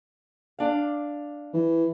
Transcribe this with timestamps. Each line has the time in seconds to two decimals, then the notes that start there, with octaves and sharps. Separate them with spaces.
0.59 D4 F5
1.54 E3